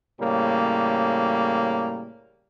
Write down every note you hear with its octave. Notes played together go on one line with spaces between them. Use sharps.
A2 C#3 G3 A#3